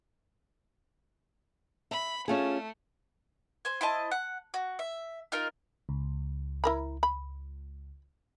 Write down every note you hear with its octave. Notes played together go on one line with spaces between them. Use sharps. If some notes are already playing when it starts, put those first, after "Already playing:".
E5 B5
A3 C#4 F4 G#4
C5 G#5
E4 C5 D#5 A5
F#5
F#4
E5
D#4 F4 A#4
C#2
E4 A#4 B5
B5